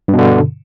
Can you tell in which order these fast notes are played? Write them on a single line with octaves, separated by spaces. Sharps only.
G2 B2 D3